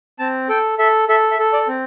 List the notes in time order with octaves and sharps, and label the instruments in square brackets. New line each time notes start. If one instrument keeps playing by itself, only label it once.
[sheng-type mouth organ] C4 A5
A4 G5
A4 E5
A4 E5
E5
A4
D5
C4